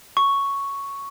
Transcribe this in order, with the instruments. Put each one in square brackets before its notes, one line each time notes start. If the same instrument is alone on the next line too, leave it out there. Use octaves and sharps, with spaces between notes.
[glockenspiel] C#6